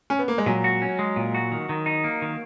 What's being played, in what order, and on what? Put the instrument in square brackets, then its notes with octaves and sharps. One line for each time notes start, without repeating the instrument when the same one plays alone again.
[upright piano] C#4
B3
A#3
G#3
[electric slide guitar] A#2 [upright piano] F#3
[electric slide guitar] F#4
C#4
G#3
A#2
F#4
D#3
D#3
D#4
A#3
D#3